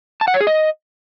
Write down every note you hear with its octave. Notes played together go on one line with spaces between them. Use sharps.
A5
F#5
C#5
G#4
D#5